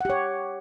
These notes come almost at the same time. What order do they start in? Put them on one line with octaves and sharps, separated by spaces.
F#5 G4 C#5